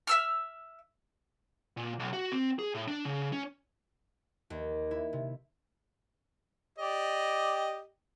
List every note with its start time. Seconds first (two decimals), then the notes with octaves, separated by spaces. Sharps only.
0.07 E5 E6 F6
1.77 A#2
2.00 B1
2.13 F#4
2.32 C4
2.59 G#4
2.74 A2
2.88 D4
3.05 C#3
3.33 C#4
4.50 D#2
4.91 E4
5.13 C3
6.78 G4 D5 D#5